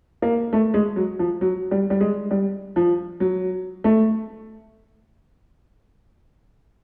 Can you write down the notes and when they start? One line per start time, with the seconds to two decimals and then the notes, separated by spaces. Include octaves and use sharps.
0.22 A#3
0.53 A3
0.74 G#3
0.96 F#3
1.19 F3
1.41 F#3
1.71 G3
1.90 G3
2.00 G#3
2.31 G3
2.76 F3
3.20 F#3
3.84 A3